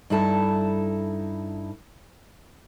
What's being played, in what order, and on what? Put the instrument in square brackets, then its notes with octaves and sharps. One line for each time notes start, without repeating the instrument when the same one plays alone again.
[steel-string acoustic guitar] G2 D#4 E4 A4 A5